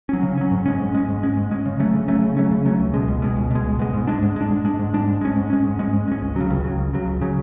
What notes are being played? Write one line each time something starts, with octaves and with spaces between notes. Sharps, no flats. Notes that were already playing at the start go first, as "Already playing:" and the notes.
F#3 C#4
C#3
F#3 C#4
G#2
G#3 C#4
G#2
G#3 C#4
G#2
G#3 C#4
G#2
G#3 C#4
C#3
F#3 A3 C#4
C#3
F#3 A3 C#4
C#3
F#3 A3 C#4
C#3
F#3 A3 C#4
C#2
B2 G#3
C#2
B2 G#3
C#2
B2 G#3
C#2
B2 G#3
G#2
G#3 D4
G#2
G#3 D4
G#2
G#3 D4
G#2
G#3 D4
G#2
G#3 C#4
G#2
G#3 C#4
G#2
G#3 C#4
G#2
G#3 C#4
C#2
C#3 F#3
C#2
C#3 F#3
C#2
C#3 F#3
C#2
C#3 F#3